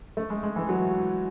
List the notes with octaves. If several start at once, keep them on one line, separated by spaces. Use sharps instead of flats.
A3
G#3
G#3
E3
F#3